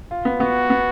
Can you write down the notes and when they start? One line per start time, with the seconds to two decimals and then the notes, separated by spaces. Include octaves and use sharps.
0.11 F4
0.25 B3
0.40 B3 F#4
0.70 B3